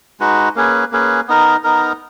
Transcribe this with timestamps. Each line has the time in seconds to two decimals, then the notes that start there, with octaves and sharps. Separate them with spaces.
0.20 G#3 D#4 F#4 B4
0.55 A#3 C#4 G#4 B4
0.92 A#3 C#4 G#4 B4
1.28 B3 D#4 A#4
1.64 B3 D#4 A#4